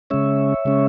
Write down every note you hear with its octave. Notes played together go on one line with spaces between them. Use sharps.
C#3 G#3 C#4 C#5 E5
C#3 G#3 C#4